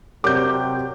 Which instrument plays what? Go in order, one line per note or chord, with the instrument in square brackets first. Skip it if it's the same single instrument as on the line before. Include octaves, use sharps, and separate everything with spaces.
[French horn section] C3 C4 [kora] F#3 A#4 D5 [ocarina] G4 [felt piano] D6 G6